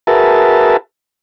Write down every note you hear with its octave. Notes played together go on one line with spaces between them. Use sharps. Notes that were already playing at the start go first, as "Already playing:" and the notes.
F#4 G#4 A#4 B4 E5 A5